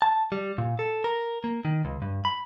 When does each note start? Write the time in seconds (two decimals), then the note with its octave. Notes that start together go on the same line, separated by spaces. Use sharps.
0.02 A5
0.32 G3
0.58 A#2
0.79 A4
1.04 A#4
1.44 A#3
1.65 D#3
1.85 C#2
2.02 G2
2.25 B5